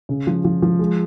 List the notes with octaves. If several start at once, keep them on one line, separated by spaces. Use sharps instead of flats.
C#3
F3
F3
F3
G#3